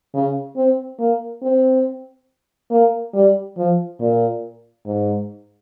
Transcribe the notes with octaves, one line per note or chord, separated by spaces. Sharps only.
C#3
C4
A#3
C4
A#3
G3
F3
A#2
G#2